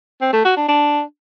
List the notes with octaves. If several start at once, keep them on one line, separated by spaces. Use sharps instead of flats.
C4
A3
F#4
D4
D4